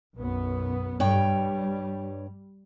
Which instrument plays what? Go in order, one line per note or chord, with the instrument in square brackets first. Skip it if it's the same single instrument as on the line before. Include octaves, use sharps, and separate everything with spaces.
[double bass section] B1 F#2 B3
[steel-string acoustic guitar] G2 C#5 G5 [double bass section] G3